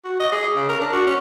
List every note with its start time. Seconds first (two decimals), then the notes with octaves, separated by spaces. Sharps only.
0.04 F#4
0.20 D#5
0.32 G#4
0.56 C#3
0.69 A#4
0.81 D4
0.92 F#4
1.07 C#4